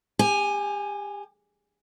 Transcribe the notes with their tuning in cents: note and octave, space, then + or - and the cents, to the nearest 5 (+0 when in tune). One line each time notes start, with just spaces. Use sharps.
G4 +35 G#5 +0